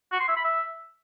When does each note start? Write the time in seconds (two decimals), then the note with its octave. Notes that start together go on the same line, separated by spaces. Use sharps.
0.12 F#4
0.20 C6
0.28 E5
0.36 B5
0.45 E5